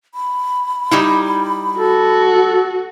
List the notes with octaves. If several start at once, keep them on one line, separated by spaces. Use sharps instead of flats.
B5
G3 D#4 E4
F#4 A4